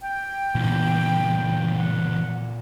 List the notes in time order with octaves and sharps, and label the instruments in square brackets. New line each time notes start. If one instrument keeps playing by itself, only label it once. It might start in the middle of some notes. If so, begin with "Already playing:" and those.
[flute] G5
[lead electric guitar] C#2 E3 [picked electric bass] A#2 B3
[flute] F#5